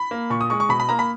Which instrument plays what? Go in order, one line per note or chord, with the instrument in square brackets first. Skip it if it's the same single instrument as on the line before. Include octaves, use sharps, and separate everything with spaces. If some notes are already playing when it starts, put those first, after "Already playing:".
Already playing: [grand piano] B5
A#3
A#2 C#6
D#6
G#3 C#6
C#6
B2 B5
B5
A#3 A#5
B5